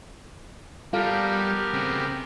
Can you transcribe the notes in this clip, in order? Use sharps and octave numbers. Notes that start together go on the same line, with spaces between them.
G3 B3 F4 G4 A4 A#4 F5
C#3 C4